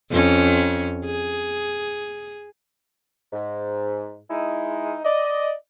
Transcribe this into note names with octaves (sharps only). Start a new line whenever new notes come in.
F2 C#4
G#4
G#2
G#3 D#4 E4
D5 D#5